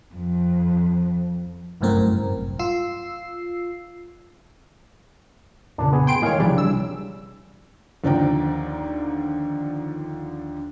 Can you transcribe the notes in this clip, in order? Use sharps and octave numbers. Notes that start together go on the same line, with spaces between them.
F2
G1 C2 F#2 A2 C4 A#4
F4 E6 C7
F2 A#2 C#3 D4
B3 G#4
G5 C6 D7
A2 D#3 G#3 G#4 C#5 F5
C2 C#3 E3 F3 G3 D4
E6
D#2 D3 F3 D5 G5 A#5